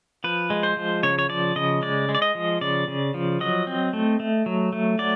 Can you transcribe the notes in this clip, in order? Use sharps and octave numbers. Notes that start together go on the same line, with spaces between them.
F3 B4
G#3
C5
F3
C#3 C#5
C#5
F3 D5
C#3 D#5
G#3 D5
G#3
D5
D#5
F3
C#3 D5
C#3
F3
F#3 D#5
C4
A3
A3
F#3
A3
F#3 D5